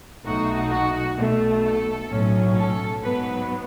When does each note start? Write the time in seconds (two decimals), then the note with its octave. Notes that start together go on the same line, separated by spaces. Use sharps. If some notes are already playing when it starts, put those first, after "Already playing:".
0.25 B1 B2 A3 D#4 F#4
0.71 F#4
1.17 B1 B2 A3
1.63 A4
2.09 B1 A2 F#3 C#4
2.56 A4
3.02 G#2 F#3 B3 B4